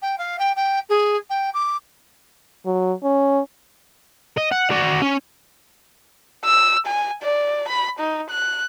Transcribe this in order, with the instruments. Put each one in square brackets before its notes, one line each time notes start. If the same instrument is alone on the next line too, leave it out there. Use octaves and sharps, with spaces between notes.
[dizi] G5
F5
G5
G5
G#4
G5
D6
[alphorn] F#3
C#4
[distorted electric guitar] D#5
F#5
F#4 D5
C#4
[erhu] E6
G#5
D5
B5
D#4
F#6